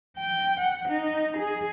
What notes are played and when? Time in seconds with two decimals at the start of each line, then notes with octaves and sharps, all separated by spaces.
0.17 G5
0.60 F#5
0.89 D#4
1.38 G#4